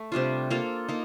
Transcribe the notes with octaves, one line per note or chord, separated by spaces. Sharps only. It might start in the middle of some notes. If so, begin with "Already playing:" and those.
Already playing: A3
C3 G3 D4 F4
A#3 F4 A4
A#3 D#4